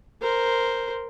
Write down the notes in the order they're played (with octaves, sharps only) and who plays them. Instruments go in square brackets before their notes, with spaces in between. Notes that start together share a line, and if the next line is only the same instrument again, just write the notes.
[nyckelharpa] A#4 C5